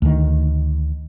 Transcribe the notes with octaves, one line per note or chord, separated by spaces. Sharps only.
D2 D#3